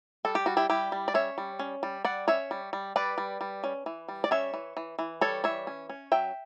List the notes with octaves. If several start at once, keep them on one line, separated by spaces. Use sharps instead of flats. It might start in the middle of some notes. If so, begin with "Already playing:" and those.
G3 A4
G4
G3 F#4
E4 G4
G3 E4 G4
G3
D5
C#4 C#5 E5
G3
C#4
G3
G3 D5 F#5
C#4 C#5 E5
G3
G3
G3 B4 D5
G3
G3
C#4
E3
G3
D5
C#4 C#5 E5
E3
E3
E3
G3 A4 C#5
E3 C#5 E5
C#4
C#4
F#3 E5 G5